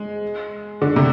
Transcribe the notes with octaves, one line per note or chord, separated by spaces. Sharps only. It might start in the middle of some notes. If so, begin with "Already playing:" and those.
Already playing: G#3
D3
C3